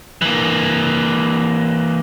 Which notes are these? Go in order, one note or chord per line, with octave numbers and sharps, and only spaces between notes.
E3 A#3